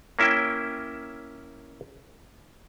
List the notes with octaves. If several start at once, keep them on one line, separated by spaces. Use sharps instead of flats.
A#3 C#4 E4 E5 G5